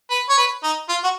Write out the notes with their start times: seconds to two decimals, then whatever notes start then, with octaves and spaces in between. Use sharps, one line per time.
0.10 B4
0.29 C#5
0.37 B4
0.63 D#4
0.89 F4
1.04 F#4